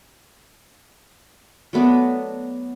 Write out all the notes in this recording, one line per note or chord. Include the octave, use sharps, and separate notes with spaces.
F#3 A3 B3 D4